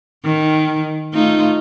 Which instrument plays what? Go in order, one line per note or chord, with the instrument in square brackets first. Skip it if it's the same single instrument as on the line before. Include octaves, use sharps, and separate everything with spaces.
[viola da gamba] D#3
A3 D#4 F4